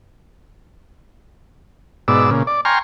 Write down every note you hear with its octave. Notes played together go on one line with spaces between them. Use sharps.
G#2 B2 D5 E6
A#2 C#3
D5
G5 G#5 A#5 C6 C#6 F6